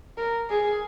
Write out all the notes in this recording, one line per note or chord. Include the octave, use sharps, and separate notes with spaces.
A#4
G#4